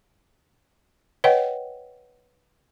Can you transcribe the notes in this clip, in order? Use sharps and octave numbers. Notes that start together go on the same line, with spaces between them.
B4 C#5 D#5 F#5 G5